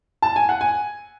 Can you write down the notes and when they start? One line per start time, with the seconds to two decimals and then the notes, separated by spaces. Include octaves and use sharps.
0.22 A5
0.36 G#5
0.49 F#5
0.61 G#5